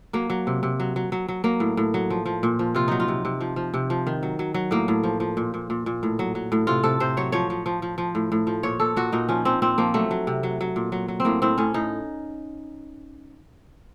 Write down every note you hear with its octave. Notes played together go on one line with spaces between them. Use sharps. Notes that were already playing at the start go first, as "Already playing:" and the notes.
F#3 A#3
F#3
C3
C3
F#3
F#3
F#3
F#3
F#3 A#3
A2
A2
F#3
F3
F3
A#2
F3
C3 F4
F#3 D#4
F4
C3
C3
F3
F3
C3
F3
D#3
F#3
F#3
F#3
A2 A#3
A2
F3
F3
A#2
A#2
A#2
A#2
A2
F#3
F#3
A2
C3 F4
C3 A4
C3 C5
F#3 C#5
F3 C#5
F3
F3
F3
F3
A2
A2
F3
A#2 C#5
A#2 A4
A#2 F#4
A#2 D#4
F3 C#4
F3 C4
A#2 C4
F3 A#3
F#3 A3
F#3
C3
F#3
F#3
A#2
F#3
F#3
C4
A2 A#3
A2 C4
A2 C#4
A2 D#4